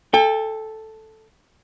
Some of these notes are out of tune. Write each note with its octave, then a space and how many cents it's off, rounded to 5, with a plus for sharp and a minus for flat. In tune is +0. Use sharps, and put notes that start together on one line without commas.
A4 +0 G5 +35